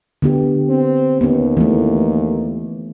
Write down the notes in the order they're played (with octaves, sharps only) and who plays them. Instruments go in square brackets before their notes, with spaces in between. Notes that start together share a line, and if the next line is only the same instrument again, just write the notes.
[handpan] D3 B3 G4
[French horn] C4
[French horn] D#2 [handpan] B3 C#4
[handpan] E3 A3